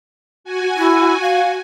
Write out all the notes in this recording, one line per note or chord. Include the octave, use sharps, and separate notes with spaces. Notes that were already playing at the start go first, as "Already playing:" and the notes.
F#4 G#5
E4
F5